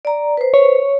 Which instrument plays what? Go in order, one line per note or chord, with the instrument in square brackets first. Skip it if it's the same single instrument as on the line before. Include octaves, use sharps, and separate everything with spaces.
[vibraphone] D5 A#5
B4 C5
[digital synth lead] C#5